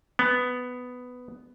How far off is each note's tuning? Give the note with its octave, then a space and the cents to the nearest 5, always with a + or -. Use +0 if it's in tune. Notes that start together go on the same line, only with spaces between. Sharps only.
B3 +10